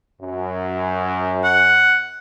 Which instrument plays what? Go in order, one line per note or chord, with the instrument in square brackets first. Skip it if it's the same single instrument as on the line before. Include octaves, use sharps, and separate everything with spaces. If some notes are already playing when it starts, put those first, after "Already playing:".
[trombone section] F#2
[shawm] F#5